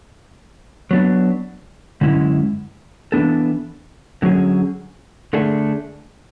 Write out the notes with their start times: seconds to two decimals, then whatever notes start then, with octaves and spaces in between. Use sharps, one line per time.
0.91 F#3 B3 D4
2.01 F#2 D3 G#3 C#4 E4
3.12 E3 B3 D4 A4
4.22 D3 F#3 C#4 G#4
5.33 D3 A3 D4 G#4